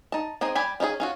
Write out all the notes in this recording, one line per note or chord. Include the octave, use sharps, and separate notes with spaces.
D#4 A5
C4 D#4 G#4 D#5
G3 G4 G#5 B5
C#4 D#4 E4 G#4
C#4 F4 F#4